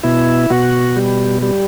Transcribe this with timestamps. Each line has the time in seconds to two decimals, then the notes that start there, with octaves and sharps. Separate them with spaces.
0.03 B2 E4
0.50 B2 F#4
0.96 G3
1.42 G3